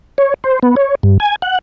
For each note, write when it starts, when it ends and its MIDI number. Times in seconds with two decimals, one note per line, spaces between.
0.18 0.34 73
0.44 0.59 72
0.63 0.75 59
0.76 0.95 73
1.03 1.18 43
1.20 1.36 80
1.42 1.59 78